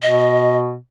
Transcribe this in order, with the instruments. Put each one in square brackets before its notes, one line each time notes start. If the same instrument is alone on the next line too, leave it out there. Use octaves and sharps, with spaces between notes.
[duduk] B2 [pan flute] D#5